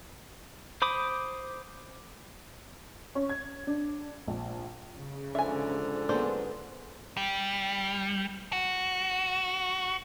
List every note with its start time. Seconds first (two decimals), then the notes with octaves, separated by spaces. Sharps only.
0.82 C5 B5 D6 D#6
3.15 C#4
3.30 G#6
3.67 D4
4.27 A#1
4.97 C#3
5.35 G#2 D3 F3 E5 G#5
6.09 D#3 B3 D4 G#4 A4 C5
7.17 G3
8.53 F#4